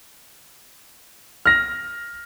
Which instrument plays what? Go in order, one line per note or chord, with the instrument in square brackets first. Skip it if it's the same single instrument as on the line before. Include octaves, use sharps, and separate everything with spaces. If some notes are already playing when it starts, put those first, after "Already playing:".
[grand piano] F6 A#6